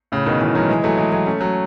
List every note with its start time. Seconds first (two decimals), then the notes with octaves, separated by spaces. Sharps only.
0.12 A2 C#3
0.26 B2 D#3
0.41 C#3 E3
0.55 D#3 F#3
0.69 E3 G#3
0.84 F#3 A3
0.98 E3 G#3
1.12 F#3 A3
1.26 A3 C#4
1.41 F#3 A3